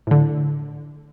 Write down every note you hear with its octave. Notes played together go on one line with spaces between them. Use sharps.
A2 D3